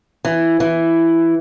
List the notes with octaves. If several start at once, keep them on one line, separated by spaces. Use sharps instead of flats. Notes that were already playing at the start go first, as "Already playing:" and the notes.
E3
E3